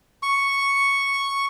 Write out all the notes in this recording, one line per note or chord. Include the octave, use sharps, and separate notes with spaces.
C#6